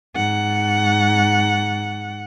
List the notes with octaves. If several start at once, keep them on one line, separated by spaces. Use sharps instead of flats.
G#2 F#5